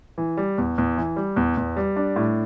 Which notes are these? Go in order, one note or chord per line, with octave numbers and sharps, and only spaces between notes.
E3
G3
E2
E2
E3
G3
E2
E2
G3
D4
A2